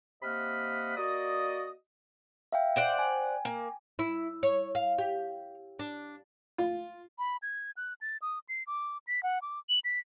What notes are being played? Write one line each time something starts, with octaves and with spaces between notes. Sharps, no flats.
C3 A#3 D#5 F#5 B5 F6
A#3 F#4 D5 D#5 D#6
E5 F5 G5
C5 D5 F#5
G5 G#5
A#3
E4
C#5
F5
G4
D4
F4
B5
G#6
F#6
A6
D#6
C7
D6
B6
F#5
D6
F#7
B6